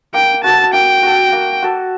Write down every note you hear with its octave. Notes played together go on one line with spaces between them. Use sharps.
A#3 G5
F#4 A4 A5
A#3 G5
F#4 A4
A#3
F#4 A4